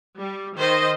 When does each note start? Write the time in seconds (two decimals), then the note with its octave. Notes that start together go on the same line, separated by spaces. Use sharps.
0.16 G3
0.57 D#3 C5 D#5